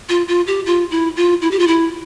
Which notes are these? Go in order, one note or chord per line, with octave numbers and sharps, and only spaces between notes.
F4
F4
G4
F4
E4
F4
E4
G4
F4
E4